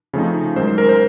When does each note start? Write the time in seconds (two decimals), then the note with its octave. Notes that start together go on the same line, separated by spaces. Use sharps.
0.13 C#3 F3 A3 C4 D#4
0.56 F#2 D#3 G#3 C5
0.68 C5
0.78 A#4
0.89 C5